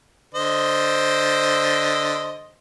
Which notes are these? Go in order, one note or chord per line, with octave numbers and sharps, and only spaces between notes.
D3 C5 D#5